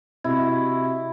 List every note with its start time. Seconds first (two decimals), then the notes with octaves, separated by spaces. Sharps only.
0.24 C3 E4 F#4 D#5 G#6